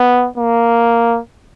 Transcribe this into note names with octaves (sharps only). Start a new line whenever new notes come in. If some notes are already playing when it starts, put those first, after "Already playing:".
Already playing: B3
A#3